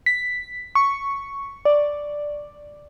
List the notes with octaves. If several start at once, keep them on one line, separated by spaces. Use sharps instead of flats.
B6
C#6
D5